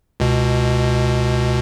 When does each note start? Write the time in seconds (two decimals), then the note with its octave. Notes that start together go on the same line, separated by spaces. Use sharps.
0.20 C#2 B2